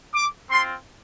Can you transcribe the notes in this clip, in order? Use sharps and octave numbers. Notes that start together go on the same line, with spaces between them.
D6
C4 F4 C6